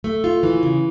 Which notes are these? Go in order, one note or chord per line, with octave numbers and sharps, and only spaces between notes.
A3
F4
E3
C#3